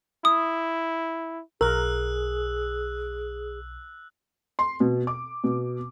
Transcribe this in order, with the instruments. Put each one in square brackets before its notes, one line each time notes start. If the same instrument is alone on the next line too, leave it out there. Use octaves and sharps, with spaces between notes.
[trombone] E4 [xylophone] D#6
[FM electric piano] B1 [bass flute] G#4 [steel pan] A#4 [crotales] E6 F#6
[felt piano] C6
B2
D6
B2